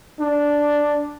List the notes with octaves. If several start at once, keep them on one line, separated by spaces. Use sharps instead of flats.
D4